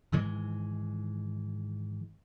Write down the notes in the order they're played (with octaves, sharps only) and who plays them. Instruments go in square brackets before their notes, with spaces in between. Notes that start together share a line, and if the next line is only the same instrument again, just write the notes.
[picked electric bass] G#2 D#3 E3 G#3